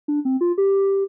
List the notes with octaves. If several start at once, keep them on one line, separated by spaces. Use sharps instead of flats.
D4
C4
F4
G4